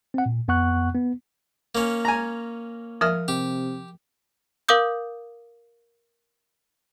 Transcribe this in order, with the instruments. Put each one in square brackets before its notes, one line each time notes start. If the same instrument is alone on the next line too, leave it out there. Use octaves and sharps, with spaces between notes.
[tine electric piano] C4 F#5
A#2
F2 B3 F#5 C#6 F#6
B3
[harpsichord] A#3 C#4
[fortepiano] G#5 A#5
[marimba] F3 A#4 E5 [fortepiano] D#6 F6
[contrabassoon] C3 [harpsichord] G4
[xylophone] A#4 F5 D6 D#6 G6